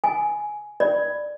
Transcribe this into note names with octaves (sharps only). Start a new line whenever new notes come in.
G#5
D5